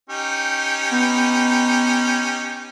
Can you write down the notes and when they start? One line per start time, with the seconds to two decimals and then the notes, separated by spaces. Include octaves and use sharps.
0.10 C#4 D#4 G4
0.92 B3